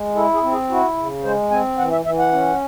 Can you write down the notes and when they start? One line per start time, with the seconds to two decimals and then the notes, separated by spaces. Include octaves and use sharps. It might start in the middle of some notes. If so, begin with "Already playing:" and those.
Already playing: G#3
0.15 E4 A4
0.34 G#4
0.43 C4
0.52 G#4
0.70 E4 F#4
0.97 C#3
1.24 G#3 C5
1.51 C4 G#5
1.78 E3 F#5
1.92 E5
2.05 E3 E5
2.19 F#5
2.32 C#4